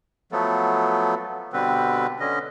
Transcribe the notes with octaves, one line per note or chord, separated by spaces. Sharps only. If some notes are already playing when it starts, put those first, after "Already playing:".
F3 F#3 A3 B3 A4
B2 D3 G3 C4 B4
D3 C#4 D#5